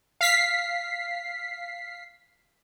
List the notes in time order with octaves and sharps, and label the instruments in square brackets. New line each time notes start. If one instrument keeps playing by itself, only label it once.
[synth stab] F5 B6 C7